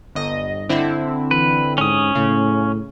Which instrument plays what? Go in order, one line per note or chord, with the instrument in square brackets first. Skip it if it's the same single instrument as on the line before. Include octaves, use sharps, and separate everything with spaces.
[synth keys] G1 D#5
D3 C4 E4
[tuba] E3 [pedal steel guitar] B4
[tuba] G#2 [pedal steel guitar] C#4 D#6
[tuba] A2 [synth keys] C#3